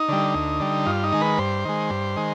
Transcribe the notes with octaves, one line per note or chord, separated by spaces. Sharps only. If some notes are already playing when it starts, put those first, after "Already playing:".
Already playing: D#4
D3 G3
D2
D3 G3
G2 F4
D#4
D#3 G#3
B4
G2 C5
D#3 G#3
G2
D#3 G#3